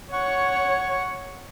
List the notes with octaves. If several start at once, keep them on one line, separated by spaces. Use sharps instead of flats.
C#5 F#5 C#6